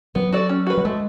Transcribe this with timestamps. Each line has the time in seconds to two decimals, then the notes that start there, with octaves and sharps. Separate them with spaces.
0.15 F#3 B3
0.33 F#4 A4 D5
0.49 C#4
0.67 F#4 B4
0.77 F#3
0.85 G#3 A3